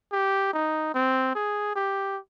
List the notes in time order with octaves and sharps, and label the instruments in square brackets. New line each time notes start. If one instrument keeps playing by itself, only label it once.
[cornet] G4
D#4
C4
G#4
G4